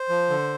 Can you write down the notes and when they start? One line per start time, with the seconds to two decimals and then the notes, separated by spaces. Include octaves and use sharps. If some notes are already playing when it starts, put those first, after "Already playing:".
Already playing: C5
0.09 F3
0.30 D3